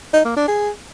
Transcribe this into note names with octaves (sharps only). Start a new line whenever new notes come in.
D#4
A#3
D4
G#4